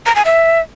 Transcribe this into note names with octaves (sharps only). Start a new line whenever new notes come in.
A#5
G#5
E5